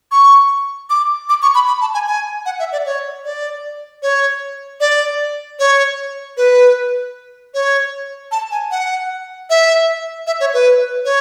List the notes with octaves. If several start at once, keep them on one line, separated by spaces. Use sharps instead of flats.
C#6
D6
D6
C#6
B5
B5
A5
G#5
G#5
F#5
E5
D5
C#5
D5
C#5
D5
C#5
B4
C#5
A5
G#5
F#5
E5
E5
C#5
B4
C#5